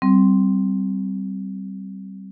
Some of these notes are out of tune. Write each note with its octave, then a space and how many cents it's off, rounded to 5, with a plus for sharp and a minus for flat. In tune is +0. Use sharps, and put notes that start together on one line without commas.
G3 -20 C4 +0